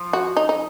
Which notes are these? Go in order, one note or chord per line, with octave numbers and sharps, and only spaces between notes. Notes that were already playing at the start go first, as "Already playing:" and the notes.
Already playing: F3
F#4
D#4
D#4